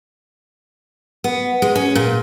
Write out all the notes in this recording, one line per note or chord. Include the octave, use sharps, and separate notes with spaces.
B3
G#3
C#4
A#2